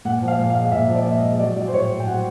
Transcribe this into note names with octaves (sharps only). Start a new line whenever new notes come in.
A#2 F#5
F3
F5
A#2
F5
G#3
F5
A#2 E5
F3
D5
A#2 E5
D#5
G#3
D#5
F#3 D5
F#3 D5
C5
A2 C#5
A2
G5
F#3 F#5